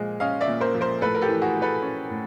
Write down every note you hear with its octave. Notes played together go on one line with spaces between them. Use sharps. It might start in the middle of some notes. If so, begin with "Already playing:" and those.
Already playing: A#2 F3 G#3
C#4 D#5 F5
D5 E5
A#2
A#4 C5
F3
A#4 C5
A2 A4 B4
A#4
G4 A4
E3
F#4 G#4
A3
A4 B4
C#4
A2